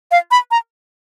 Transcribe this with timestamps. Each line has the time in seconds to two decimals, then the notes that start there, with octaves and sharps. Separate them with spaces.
0.11 F5
0.31 B5
0.51 A#5